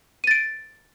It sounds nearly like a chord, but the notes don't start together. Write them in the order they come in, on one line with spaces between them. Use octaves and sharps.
D#7 A6 D7